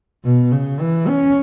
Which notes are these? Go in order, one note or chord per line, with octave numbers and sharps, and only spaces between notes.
B2
C#3
E3
C#4